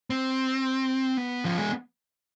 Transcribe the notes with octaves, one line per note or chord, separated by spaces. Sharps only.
C4
B3
F3
G#3